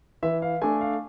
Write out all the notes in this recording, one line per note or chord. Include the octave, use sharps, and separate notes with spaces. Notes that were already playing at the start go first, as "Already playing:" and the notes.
E3 E5
F5
A3 D4 G#5
F5